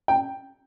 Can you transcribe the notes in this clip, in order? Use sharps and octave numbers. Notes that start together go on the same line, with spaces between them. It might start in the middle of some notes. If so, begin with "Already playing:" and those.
G5